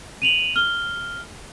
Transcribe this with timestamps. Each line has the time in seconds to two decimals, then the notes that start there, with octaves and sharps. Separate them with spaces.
0.22 D#7 F7 F#7
0.56 F6 G7